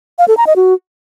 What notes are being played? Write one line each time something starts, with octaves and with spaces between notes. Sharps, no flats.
F5
A4
A#5
D#5
F#4